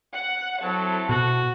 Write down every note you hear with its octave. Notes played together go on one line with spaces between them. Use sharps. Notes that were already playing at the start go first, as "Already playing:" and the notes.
F#5
F#3 C4 E4 A4
B2 F#4